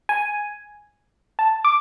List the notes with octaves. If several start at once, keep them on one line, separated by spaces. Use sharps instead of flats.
G#5
A5
D6